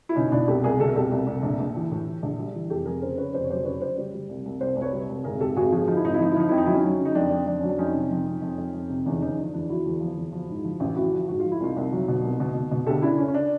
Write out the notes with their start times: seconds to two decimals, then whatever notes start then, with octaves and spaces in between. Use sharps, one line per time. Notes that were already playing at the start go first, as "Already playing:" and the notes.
0.09 E4
0.16 B2 C#4 D#4
0.32 B2 D4 E4
0.48 C2 G4 A4
0.63 C2 G#4 A#4
0.80 B2 A4
0.88 A#4
0.95 C2 G4 A4
1.12 C2
1.27 C2
1.43 A#1
1.59 A#1
1.76 E3
1.91 A2
2.07 E3
2.23 A#1
2.39 G3
2.54 E3
2.70 F1 G4 A4
2.86 F2 G#4 A#4
3.01 C#3 A#4 C5
3.17 C#3 B4 C#5
3.33 F1 C5 D5
3.44 C#5
3.50 F#3 C5 D5
3.65 C#3 B4 C#5
3.81 C#3 C5 D5
3.97 G3
4.14 G3
4.29 C2
4.45 C2
4.61 C2 C5 D5
4.76 C2
4.82 B4 C#5
4.92 G3
5.09 C2
5.24 G#1 G#4 A#4
5.41 G#1 G4 A4
5.56 G#1 F#4 G#4
5.72 F3 F#4 G#4
5.88 F3 D#4
5.97 E4
6.04 G#1 D#4
6.14 E4
6.19 F3 D#4
6.32 E4
6.36 F3 D#4
6.49 F2 E4
6.58 D#4
6.66 F#3 E4
6.74 C#4 D#4
6.84 F#3
6.99 C#3
7.05 D#4
7.15 F2 D4
7.30 F2
7.47 F2 D4
7.59 F#3 C#4
7.69 D4
7.78 F2 C#4 D#4
7.95 C3
8.11 F2
8.27 F2
8.42 F2
8.58 F2
8.74 F2
8.89 C3
9.05 E2 C#4 D#4
9.21 E2 C#4 D#4
9.37 F3 D4
9.53 E2 D4 E4
9.69 F3 E4 F#4
9.85 E2
10.00 F3
10.17 E2
10.32 F3
10.49 G#2
10.64 F3
10.80 A1
10.96 A1 E4 F#4
11.12 F3
11.28 G#2 F#4
11.39 F4
11.45 F3
11.52 E4
11.60 C2 D#4 F4
11.76 C2
11.92 F#3
12.08 B2
12.24 C2
12.40 B2
12.55 B2
12.71 B2
12.87 D2 G4 A4
13.02 C#3 D4 E4
13.18 C#3 C#4
13.28 C#4
13.34 D4